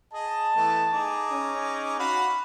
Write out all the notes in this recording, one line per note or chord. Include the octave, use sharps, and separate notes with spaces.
G#4 D#5 A5
E3 A3 B3
D#4 G#4 D6
C#4
F#4 F5 F#5 B5